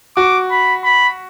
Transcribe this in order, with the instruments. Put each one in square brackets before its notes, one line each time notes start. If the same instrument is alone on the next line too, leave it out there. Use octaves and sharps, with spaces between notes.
[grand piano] F#4 [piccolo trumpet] D6
[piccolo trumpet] B5
B5